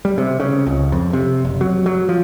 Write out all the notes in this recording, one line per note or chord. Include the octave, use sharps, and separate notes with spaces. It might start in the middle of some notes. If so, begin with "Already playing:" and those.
G3
C3
C#3
C#2
F2
C3
F#1
F#3
F#3
F3